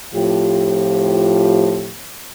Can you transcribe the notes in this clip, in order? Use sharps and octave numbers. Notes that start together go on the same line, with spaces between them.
A2 F3 C4 F4 G4